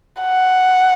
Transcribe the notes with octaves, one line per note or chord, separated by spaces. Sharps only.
F#5